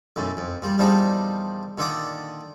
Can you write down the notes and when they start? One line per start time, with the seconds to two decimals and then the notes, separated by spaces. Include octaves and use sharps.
0.16 B1 F#2 A2
0.37 F2
0.62 A#2 G3
0.78 E2 A#2 F3 G3 D4 D#4
1.78 A#2 D3 D#3 D5 D#6